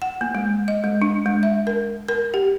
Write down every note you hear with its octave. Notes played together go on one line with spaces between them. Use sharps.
F#5
A#3
G#3
D#5
G#3
D4
G#3
E5
A#4
A#4
G4